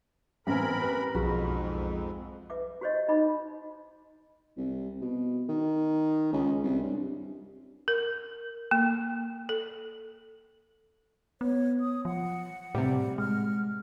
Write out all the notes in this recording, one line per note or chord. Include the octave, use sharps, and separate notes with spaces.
A1 B3 C4 A#4 G#5 B5
G4 B4
B1 F2 G#2 F3 F#4 G#4 B5
B4 E5 D6
F#4 G4 C5 C#5 D#5
D#4 D#5 B5 C6 D6
C2
B2
D#3
C#2
C2
G2
A#4
A#3
A4
B3 C#5
D#6
F3 F#5
A2 C3 G3
G#3 F6